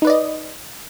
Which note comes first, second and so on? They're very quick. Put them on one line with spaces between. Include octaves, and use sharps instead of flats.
D#4 B4 D5 D#5